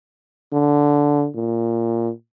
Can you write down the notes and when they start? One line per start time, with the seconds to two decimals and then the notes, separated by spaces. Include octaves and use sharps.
0.52 D3
1.35 A#2